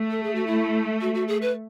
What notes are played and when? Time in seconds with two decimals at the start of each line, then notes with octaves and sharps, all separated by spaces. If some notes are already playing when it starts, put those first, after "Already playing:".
Already playing: A3
0.10 A4
0.23 G#4
0.35 F#4
0.47 E4
1.01 F#4
1.14 F#4
1.28 G#4
1.42 B4